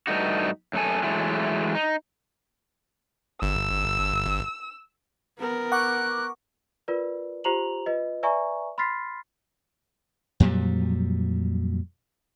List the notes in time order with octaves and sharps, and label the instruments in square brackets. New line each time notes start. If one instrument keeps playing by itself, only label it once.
[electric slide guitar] G2 A3 D#4 F#4
F#2 A3 A4 G#5
E3 F#3 G#3 A3
D#4
[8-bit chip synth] G1 [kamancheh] E6
[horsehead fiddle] B3 A#4
[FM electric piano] F#5 C#6 D6 [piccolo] F#6
[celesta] F4 A#4 B4 D5
F4 G4 C5 A#5 F7 F#7
F4 B4 D#5
B4 D5 E5 G#5 A#5 C#6
B5 C6 F6 A6 B6 C7
[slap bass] F2 A#2 F#3 G3